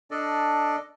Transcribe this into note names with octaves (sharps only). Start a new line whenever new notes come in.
D4 A4 D5 D#5